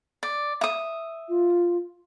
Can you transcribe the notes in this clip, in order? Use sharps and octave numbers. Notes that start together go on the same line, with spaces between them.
D5
E5 D#6
F4